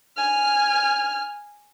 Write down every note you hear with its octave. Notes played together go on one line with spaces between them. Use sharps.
G#5 F6